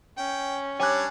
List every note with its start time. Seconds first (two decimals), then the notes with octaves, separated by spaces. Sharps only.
0.18 C#4 G5
0.80 G3 D4 C#5 G#5 F#6